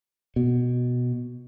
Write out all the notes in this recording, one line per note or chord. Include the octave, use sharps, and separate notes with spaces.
B2